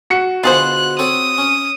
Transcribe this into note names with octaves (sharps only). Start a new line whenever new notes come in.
F#4 C#7
B2 D3 F4 G#4 C5 F#6
C4 A4 C#5 D#6
C#4